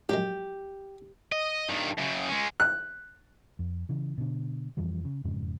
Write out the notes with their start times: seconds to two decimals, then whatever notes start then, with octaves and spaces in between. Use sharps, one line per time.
0.09 A#1 F#2 G#3 G4
1.32 D#5
1.69 G2 D#3
1.98 F#2 C#3
2.28 G#3 C#4
2.60 F#6
3.59 F2
3.89 C#3 E3
4.18 B2 D3
4.77 F2 E3 F3 G3
5.05 C#3
5.24 E1 F2 G#2 C#3